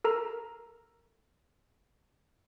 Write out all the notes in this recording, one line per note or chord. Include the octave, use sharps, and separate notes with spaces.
A4 A#4 A#5